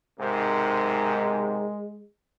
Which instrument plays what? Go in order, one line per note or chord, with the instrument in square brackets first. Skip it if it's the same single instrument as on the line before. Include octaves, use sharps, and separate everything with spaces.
[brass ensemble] B1 D#4 A#4 [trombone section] G#2 C3 [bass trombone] G#3